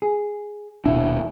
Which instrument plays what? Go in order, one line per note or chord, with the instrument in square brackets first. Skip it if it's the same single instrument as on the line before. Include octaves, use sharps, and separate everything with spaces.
[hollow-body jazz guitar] G#4
[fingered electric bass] D#1 B2 D4 [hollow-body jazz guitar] E4